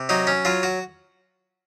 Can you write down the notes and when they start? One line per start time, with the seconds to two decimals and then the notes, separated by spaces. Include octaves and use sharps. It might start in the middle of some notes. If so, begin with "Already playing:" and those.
Already playing: C3
0.09 F#3 D#4
0.27 C#4
0.45 F#3 F4
0.63 F#4